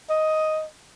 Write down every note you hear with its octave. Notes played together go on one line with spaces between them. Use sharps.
D#5